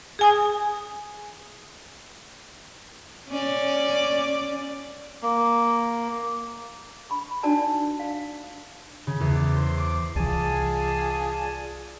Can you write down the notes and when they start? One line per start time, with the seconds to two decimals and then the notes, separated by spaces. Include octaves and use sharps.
0.19 G#4 G#5 D#6
3.29 C#4 D5
5.22 A#3
7.10 B5 C#6
7.43 D4 D#4 F#4 A#4 D5 A5
8.00 F5
9.07 C#3
9.20 E2
9.35 D5
9.56 C5
9.78 D6
10.16 C2 E3 F4 G#4 D5 G#5 A5